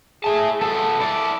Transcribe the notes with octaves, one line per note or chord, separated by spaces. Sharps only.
E4 G#4 A5
B3 A4 A5
E4 D5